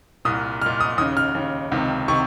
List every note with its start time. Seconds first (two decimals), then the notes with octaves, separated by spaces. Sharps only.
0.25 C2 A#2 D#6
0.61 C2 A#2 F6
0.81 D#6
0.98 D#2 C#3 D#6
1.17 F6
1.35 D#2 C#3
1.72 C#2 C3 D#3
2.08 C3 D#3 C#6